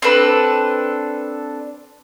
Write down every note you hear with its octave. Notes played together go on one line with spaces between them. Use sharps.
C4 D4 A4 B4